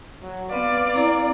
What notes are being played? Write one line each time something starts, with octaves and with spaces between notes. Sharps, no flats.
F#3
B3 C4 B4 D5 F5
C4 E4 A#5